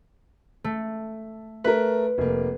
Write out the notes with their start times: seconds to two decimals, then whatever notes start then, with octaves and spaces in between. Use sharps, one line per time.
0.64 A3
1.64 A3 A#4 B4
2.18 F1 A#3